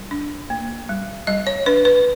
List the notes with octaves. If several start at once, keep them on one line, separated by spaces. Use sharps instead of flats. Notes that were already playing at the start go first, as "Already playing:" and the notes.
Already playing: G3
D4
A#3
G3
G3 D#5
C#5
D4 B4
B4